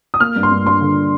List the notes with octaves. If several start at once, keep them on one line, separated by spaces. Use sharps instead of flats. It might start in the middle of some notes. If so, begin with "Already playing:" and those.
D#6
A#3 F6
G2
C6
G2
G2 C6
D3